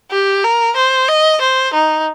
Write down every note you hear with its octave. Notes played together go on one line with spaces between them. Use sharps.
G4
A#4
C5
D#5
C5
D#4